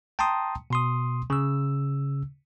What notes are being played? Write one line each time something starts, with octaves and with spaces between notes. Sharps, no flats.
G5 A5 A#5 C6 D#6
B2 C6 D#6
C#3 E6